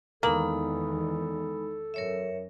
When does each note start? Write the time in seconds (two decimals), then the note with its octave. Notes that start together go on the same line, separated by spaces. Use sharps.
0.23 E2 D#3 E3 G#3 A#3 D#4 A4 B5
1.94 F#2 A#4 C#5 E5